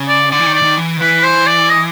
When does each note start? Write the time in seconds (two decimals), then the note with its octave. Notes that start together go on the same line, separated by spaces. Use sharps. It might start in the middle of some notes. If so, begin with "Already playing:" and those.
Already playing: C#3
0.08 D5
0.31 D3 D5
0.40 E3
0.46 D#3
0.54 D5
0.62 D#3
0.78 E3
0.97 D#3
1.00 E3 B4
1.23 C5
1.46 D5
1.70 D#5